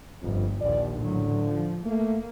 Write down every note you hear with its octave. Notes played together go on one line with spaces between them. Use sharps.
G1 F2
A#1 D#2 D5
A1 D3 F#3
F3
A3 A#3